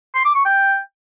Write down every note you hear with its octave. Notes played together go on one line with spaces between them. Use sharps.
C6
D6
C#6
G5